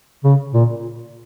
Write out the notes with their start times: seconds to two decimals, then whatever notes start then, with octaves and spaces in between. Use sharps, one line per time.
0.24 C#3
0.54 A#2